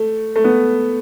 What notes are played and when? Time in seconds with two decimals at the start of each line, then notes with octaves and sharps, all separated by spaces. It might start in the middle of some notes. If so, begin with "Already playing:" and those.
Already playing: A3
0.36 A3
0.44 B3